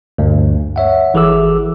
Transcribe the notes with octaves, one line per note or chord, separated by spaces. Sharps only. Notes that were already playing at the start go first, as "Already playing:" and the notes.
D2 G2
C#5 E5 F#5
G#1 E3 G#4 A4 D6 E6